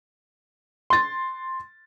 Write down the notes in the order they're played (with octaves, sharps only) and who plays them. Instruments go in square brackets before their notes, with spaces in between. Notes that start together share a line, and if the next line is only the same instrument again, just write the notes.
[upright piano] C6 A6